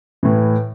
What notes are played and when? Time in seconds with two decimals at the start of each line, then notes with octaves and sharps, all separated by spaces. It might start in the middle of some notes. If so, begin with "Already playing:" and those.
0.23 A2 E3